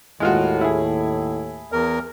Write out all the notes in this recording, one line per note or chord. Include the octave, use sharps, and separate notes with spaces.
D#2 A2 G#3 F4 F#4
E4 G#4
E2 A#4